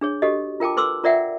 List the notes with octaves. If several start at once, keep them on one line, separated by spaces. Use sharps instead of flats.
D4 G#4 C#5
F#4 G4 A4 D#5
F4 A#4 G5 A5 D6
A4 B4 C6 D6 E6
F4 A#4 D5 E5 F#5 G5